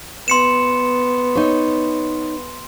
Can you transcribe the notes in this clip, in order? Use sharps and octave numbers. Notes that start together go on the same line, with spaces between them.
B3 C6 C#7 E7
D#4 C#5